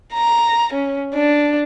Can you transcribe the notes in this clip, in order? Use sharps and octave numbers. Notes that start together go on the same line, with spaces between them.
A#5
C#4
D4